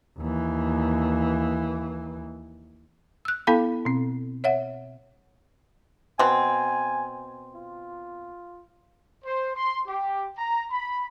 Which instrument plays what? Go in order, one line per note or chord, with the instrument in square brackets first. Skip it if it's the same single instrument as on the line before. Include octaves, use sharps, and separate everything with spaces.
[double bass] D#2 E3
[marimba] E6 F#6
B3 E4 A4 F5 G5 B5
B2 C4
C#5 E5 F#5
[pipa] B2 C4 [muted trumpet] G#5
[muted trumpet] F4
[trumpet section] C5
C6
G4
A#5
B5